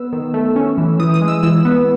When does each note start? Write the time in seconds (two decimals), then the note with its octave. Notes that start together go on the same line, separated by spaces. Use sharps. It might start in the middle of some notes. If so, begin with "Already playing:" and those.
Already playing: B3 E6
0.13 D#3
0.34 A3
0.56 C#4
0.78 E3
0.99 E3 D#6
1.14 D#6
1.22 G#3
1.28 E6
1.43 E3 E6
1.65 B3